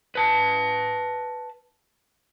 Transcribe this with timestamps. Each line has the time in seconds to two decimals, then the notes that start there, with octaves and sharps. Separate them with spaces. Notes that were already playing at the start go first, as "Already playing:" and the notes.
0.15 B4 A5